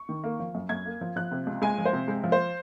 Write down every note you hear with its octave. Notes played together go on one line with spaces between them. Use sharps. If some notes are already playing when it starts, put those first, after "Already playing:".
Already playing: C#6
D#3
A#3
F3
F#2
F#2 G#6
A#3
F3
F3 F#6
C3
C#2
G#3 G#5
F3
C5
C3
G#3
F3
C5